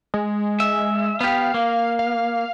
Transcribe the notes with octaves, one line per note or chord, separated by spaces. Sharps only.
G#3
E5
B3 G4 F5
A#3
F5